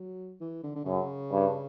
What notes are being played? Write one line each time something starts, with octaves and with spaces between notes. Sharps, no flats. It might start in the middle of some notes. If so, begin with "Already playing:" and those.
Already playing: F#3
E3
D3
D3
F#2 C#3
G2